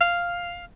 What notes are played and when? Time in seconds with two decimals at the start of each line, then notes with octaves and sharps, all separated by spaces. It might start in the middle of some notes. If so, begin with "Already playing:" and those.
0.01 F5